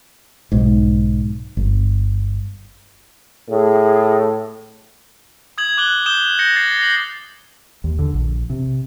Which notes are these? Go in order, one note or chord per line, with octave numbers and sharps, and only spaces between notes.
B1 G#2
G1
A2 G#4
D#6 G#6 F#7
D6 F#6 F#7 G7
D#6 G6 E7 G7
G6 A#6 C#7
A6 C7
A#6 C7 F#7
D#2
D3
A#1
C3